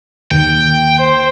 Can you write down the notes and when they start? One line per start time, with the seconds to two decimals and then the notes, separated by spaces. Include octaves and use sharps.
0.31 D#2 G5
0.99 C5